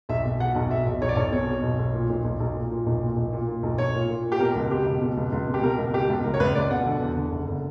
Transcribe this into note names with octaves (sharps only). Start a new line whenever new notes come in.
B1 E5
B2
B2 F#5
B1
B2 E5
B1
B1 C#5
D5
B1 C#5
B2 C#5
B2
B1
B1
A#2
B1
B1
B1
A#2
A#2
B1
A#2
B1
A#2
A#2
B1
B1 C#5
A#2
A#2
A#2
G4
B2 A#4
C#2
B2 G4
C#2
B2
C#2
C#2
B2
G4
B2 A#4
C#2
B2 G4
C#2
C#2 A#4
C#5
C#2 B4
C#2 D5
B2 F#5
D3
E2
D3
F#1
D3